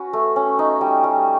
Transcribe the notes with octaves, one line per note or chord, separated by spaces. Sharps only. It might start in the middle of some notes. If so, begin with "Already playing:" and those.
Already playing: C#4 F#4 B4
A3
C#4
D#4
G3
G3